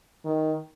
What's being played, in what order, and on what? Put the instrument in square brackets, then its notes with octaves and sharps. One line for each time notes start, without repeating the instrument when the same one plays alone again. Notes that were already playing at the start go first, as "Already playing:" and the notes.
[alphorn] D#3